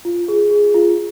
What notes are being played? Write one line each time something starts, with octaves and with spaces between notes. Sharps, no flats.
F4
G#4
G#4
F4